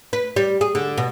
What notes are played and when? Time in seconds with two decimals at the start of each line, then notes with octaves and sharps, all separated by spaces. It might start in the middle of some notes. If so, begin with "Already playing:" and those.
0.13 B4
0.36 G3
0.61 G#4
0.75 D3
0.98 B2